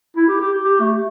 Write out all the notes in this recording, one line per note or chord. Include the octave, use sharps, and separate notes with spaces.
E4
G4
G4
G4
A3